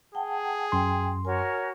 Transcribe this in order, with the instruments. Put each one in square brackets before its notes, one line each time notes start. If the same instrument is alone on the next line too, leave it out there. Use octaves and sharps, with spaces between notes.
[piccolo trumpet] G#4 [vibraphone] F#5 G5 A5
[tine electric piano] F#2 C6 [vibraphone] G5 G#5
[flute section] F#4 A#4 C#5 [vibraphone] G#5